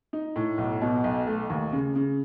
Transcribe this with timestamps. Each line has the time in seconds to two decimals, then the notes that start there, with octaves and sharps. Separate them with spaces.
0.13 D#4
0.36 A2
0.58 B1
0.81 B2
1.04 B1
1.27 A3
1.50 D#2
1.72 C#3
1.96 C#3